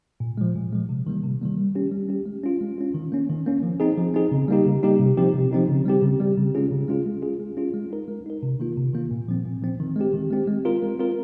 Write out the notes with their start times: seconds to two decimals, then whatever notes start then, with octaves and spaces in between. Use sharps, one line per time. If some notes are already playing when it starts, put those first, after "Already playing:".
0.20 A#2
0.38 F3 G#3
0.55 A#2
0.72 F3 G#3
0.89 C3
1.07 D#3 G3 A#3
1.23 C3
1.41 D#3 G3 A#3
1.58 G3
1.75 C#4 G4
1.91 G3
2.08 C#4 G4
2.26 G#3
2.44 C#4 F4
2.61 G#3
2.78 C#4 F4
2.94 D#3
3.12 A#3 C#4
3.30 D#3
3.46 A#3 C#4
3.63 F3
3.80 C4 D#4 G#4
3.97 F3
4.14 C4 D#4 G#4
4.32 C#3
4.48 G3 A#3 D#4 G4
4.65 C#3
4.83 G3 A#3 D#4 G4
5.00 C3
5.17 F3 C4 D#4 G4
5.34 C3
5.52 F3 C4 D#4 G4
5.69 C#3
5.85 G3 C4 G4
6.02 C#3
6.20 G3 C4 G4
6.37 C#3
6.55 G#3 C#4 F4 G#4
6.71 C#3
6.88 G#3 C#4 F4 G#4
7.06 G#3
7.22 C#4 F4 G#4
7.40 G#3
7.57 C#4 F4 G#4
7.74 G#3
7.91 D#4 A#4
8.08 G#3
8.26 D#4 A#4
8.43 C3
8.60 D#3 A#3 F4
8.77 C3
8.93 D#3 A#3 F4
9.11 A#2
9.28 F3 C4
9.45 A#2
9.62 F3 C4
9.80 D#3
9.96 G#3 C4 G4
10.14 D#3
10.31 G#3 C4 G4
10.47 G#3
10.65 C4 F4 A#4
10.83 G#3
10.99 C4 F4 A#4